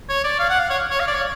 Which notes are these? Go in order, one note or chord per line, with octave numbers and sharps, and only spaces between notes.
C#5
D5
F5
F#5
F5
C#5
C#5
F5
D5
C#5